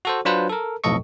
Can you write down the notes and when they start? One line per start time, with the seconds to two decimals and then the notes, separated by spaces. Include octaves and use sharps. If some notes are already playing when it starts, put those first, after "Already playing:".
0.05 F#4 A4 C5
0.25 F#3 D4 F4 B4 C5
0.49 A4 A#4
0.84 B1 F2 A2 A4 D#5 C#6